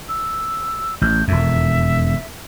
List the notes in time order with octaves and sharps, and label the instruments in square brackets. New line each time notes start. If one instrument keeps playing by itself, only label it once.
[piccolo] E6
[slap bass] A1 [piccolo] G6
[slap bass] E1 F2 [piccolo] E5